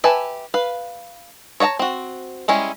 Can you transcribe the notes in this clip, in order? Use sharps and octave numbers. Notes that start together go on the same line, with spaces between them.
G4 B4 E5 G#5 A5
B4 F5
C#5 D#5 F#5 A5 A#5
C4 F#4
G3 G#3 C#4 E4